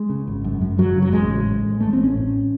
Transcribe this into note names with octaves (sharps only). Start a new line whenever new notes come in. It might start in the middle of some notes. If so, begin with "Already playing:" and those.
Already playing: G#3
C#3
G#1
F#2
F#2
F#2 F#3
C#3
F#3
A1 G#3
A2
A2
A1
A1 A3
C4
A1
C#4
A2